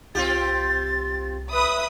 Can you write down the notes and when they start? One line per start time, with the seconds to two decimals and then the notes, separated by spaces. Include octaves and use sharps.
0.15 C2 C4 F4 G4 A6
1.53 B4 E5 B5 D#6